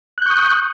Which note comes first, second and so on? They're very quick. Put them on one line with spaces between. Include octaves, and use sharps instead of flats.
F#6 G6 C#6 D#6